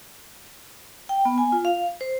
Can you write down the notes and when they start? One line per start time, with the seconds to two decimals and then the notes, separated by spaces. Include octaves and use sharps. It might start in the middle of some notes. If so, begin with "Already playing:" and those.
1.09 G5
1.25 B3
1.38 G#5
1.52 F4
1.65 F5
2.01 C5